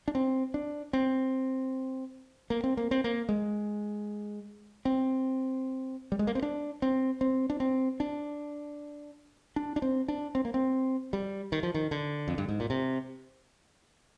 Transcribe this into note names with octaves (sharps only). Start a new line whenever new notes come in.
D4
C4
D4
C4
A#3
C4
A#3
C4
A#3
G#3
C4
G3
G#3
A#3
C4
D4
C4
C4
D4
C4
D4
D4
D4
C4
D4
C4
A#3
C4
G3
D#3
F3
D#3
D3
F2
G2
G#2
A#2
C3